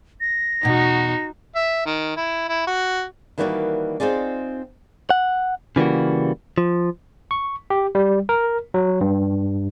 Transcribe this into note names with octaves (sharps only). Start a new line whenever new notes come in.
A#6
E2 B2 D#4 F#4
E5
D#3
E4
E4
F#4
D#3 E3 G3 A#3 F#4 D5
C4 D#4 F4 G#4 D5
F#5
C#3 E3 G3 A#3 F#4
F3
C#6
G4
G3
A#4
F#3
G2